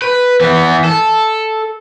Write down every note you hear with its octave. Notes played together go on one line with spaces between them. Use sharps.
B4
E3 B3
A4